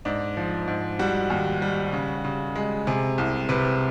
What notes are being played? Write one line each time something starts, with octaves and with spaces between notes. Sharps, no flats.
G#2 D4
F3
G#2
G3 F#4
D#2
G3
C#3
C#3
G#3
C3 G#4
C2
C3 B4